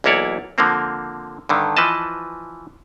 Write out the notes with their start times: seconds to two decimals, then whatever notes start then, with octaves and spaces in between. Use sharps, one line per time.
0.04 B1 E2 A#3 E4 C#5 D5
0.58 D3 F3 A#3 C4
1.49 G2 D3 D#3
1.77 E3 F3 B4 D#5 A5